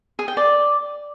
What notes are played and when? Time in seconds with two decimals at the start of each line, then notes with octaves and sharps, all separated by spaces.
0.19 G#4
0.28 G5
0.37 D5